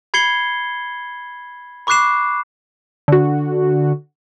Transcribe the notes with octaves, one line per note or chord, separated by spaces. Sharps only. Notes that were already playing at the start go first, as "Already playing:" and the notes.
B5 G#6 C7 C#7 G7
B5 C#6 D6 F#6 C7 E7
D3 F#4